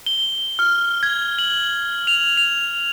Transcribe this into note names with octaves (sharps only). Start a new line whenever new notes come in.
G7
F6
G#6
F#7
F7
F7